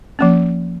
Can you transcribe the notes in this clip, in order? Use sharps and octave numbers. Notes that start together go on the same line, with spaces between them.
F3 A#3 C#4